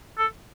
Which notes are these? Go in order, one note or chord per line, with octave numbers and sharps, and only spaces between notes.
A4